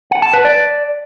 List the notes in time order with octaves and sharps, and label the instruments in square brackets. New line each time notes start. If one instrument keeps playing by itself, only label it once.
[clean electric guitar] F#5
A5
B4
D5